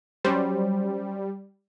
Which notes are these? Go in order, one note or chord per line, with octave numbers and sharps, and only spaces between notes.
F#3 G3 C#4 C5